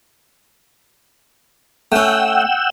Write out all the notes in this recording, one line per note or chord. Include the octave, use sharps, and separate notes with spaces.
A3 C#4 F#5 G5 E6